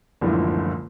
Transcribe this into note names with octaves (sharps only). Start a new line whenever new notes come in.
F#1 C#2 A2 D3 E3 F3